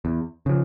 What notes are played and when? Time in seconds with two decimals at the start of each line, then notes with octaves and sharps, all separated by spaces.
0.05 E2
0.46 C#3 F3